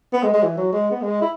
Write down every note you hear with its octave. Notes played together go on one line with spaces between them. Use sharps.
B3
G#3
G#3
E3
F#3
G#3
B3
G#3
E4